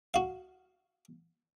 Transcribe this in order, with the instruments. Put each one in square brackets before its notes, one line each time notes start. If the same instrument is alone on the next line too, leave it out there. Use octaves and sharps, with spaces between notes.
[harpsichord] F#4 F5